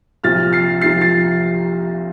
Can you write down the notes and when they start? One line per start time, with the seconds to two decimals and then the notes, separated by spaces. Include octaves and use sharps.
0.24 C2 A#2 F3 F6 A6
0.52 A6 C7
0.81 C2 A#2 F3 A6 C7
1.01 A6 C7